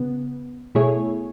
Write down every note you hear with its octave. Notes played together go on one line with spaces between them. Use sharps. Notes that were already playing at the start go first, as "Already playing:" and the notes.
Already playing: C#3 B3
B2 A3 E4 G#4 C#5